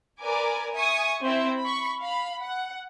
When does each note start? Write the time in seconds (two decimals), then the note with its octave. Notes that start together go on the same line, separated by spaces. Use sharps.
0.22 A#4 B4 D5 G#5 D6
0.72 E5 G#5 C#6 D#6
1.23 C4 E4 C5 E5
1.59 B5 C#6
2.01 F5 B5
2.41 F#5